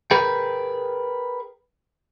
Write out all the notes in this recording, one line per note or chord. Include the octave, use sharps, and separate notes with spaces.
G#4 A#4 B4 G5